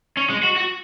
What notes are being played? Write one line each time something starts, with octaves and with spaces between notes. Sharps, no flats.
C#4
G#3
F#4
F#4